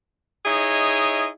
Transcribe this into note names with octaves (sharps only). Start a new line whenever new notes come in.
D#4 E4 G#4 C#5 D#5